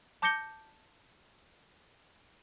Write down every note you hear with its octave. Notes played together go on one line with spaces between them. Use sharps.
A5 D6 G6 A#6 C#7 G7